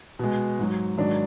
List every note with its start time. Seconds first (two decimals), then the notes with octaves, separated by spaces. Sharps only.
0.19 B2 G#3
0.59 G#2 F#3
0.97 G#2 D#3 F#3 D4